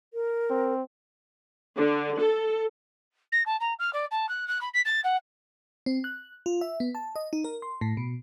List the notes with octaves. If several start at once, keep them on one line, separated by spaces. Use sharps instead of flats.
A#4
C4
D3
A4
A#6
A5
A#5
F6
D5
A5
F#6
F#6
B5
B6
A6
F#5
C4
F#6
F4
E5
B3
A5
D#5
D#4
A#4
C6
A2
B2